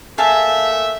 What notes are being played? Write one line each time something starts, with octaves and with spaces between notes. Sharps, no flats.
A3 A#3 G#4 E5 F5 A5